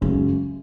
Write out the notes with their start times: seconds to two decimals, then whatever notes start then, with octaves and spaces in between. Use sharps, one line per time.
0.01 F#2 C#3 G#3 A3